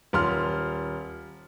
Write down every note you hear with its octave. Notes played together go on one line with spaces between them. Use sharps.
D#1 C6 F6